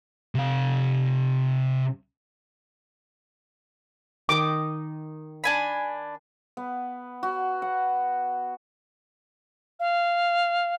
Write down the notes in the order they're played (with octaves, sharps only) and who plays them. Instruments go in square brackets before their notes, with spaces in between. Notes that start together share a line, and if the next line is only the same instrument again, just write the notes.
[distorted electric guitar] C3 F5
[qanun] D#3 D#4 D#5 [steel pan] D6
[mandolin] D4 G#5 B5
[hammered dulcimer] B3
F#4
F#5
[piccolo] F5